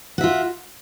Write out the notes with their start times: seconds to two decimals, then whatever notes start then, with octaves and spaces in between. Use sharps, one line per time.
0.18 F#4
0.21 E5
0.24 F4